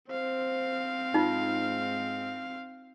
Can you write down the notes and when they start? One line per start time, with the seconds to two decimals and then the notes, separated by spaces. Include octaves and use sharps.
0.10 C4 C5 F5
1.14 G#2 D#4 F4